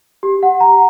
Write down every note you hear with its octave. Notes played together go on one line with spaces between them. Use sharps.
G4
F#5
A#5